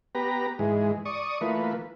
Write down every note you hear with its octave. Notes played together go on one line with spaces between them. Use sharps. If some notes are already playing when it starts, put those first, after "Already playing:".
B3 G4 B4 A#5
G#2 E3 G#3
D5 C#6 D#6
E3 A3 A#3 F4 B4